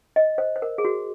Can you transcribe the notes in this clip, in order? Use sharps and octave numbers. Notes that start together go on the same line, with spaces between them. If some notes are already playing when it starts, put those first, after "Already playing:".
D#5
C5
C5
A#4
G#4
F#4